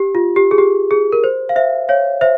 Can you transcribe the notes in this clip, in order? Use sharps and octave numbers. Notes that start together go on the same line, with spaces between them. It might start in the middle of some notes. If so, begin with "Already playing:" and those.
Already playing: G4
F4
G4
G#4
G4
G#4
A#4
C5
F5
C5 E5
C#5 F5
C5 E5